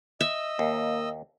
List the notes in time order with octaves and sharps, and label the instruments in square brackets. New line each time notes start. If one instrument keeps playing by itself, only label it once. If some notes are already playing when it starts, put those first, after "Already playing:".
[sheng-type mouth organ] D#5 E6 [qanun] E5
[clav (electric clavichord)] D#2 [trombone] A#3